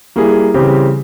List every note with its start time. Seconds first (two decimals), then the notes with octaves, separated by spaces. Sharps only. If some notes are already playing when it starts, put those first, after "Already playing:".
0.16 G3 A#3 E4 G#4
0.54 C#3 E3 G3 C4 G4